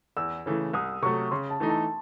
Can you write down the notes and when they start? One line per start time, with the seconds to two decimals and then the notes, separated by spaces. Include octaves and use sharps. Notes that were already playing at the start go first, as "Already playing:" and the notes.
0.17 E2 E6
0.46 C#3 E3 A3
0.73 C2 D#6
1.02 C3 F#3 A3 C#6
1.31 C#3 C6
1.50 A5
1.60 E3 A3 D#4
1.69 A5